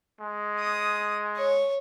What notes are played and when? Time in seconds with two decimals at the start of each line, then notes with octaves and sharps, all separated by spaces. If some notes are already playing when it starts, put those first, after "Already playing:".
0.20 G#3
0.59 D#6
1.36 C#5